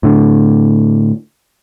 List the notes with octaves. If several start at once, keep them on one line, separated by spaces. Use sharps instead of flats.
A2 D3